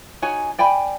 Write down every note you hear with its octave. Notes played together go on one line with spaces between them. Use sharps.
D#4 F#4 C#5 G#5
D5 G5 G#5 B5